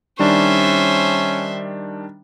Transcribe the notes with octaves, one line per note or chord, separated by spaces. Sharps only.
D#3 G3 C#4 D4 C5 E5 C#6